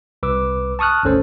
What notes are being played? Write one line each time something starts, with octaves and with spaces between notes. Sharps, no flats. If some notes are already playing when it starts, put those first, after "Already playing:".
C2 B4 D6 E6
A5 C#6 D#6 F6 F#6
G#1 D2 C#4 A4 C5